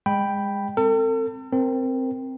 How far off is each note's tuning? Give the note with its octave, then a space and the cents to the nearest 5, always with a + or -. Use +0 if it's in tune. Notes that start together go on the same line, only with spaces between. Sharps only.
G#3 -30 G5 +0 B5 +0
C4 +0 A4 +40
C4 +0 A#4 +0